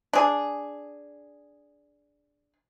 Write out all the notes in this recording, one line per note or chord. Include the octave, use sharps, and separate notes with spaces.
D4 G#4